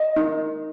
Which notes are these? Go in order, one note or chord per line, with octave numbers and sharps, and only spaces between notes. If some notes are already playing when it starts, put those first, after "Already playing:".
Already playing: D#5
D#4